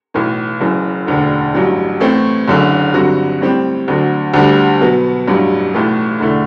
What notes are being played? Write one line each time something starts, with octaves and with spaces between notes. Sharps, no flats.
B1 A2 E3
F#1 F#2 E3
E1 D2 D3
A1 G2 F#3
A2 E3 A3 C4
F#1 F#2 D3
G2 D3 F#3 C4 F#4
A2 G3 C4 G4
D2 D3 F#3
D2 D3 G3
B2 F#3 B3
A1 G2 F#3
B1 A2 E3 A3
E1 D3 A3 E4